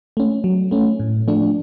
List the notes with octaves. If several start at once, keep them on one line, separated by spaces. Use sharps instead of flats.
A3 C#4
F#3
A3 C#4
A2
F3 A3 D4